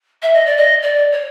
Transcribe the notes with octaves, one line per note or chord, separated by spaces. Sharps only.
E5
D#5
D5
D#5
D5
C#5